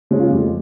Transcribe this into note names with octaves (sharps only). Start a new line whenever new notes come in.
C#3 G#3 C#4
F4
F2 G4